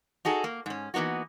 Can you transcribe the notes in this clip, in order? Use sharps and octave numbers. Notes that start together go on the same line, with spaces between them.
D#4 F#4 G#4 A4
A#3
G#2 C#4
E3 A#3 B3 D#4 F#4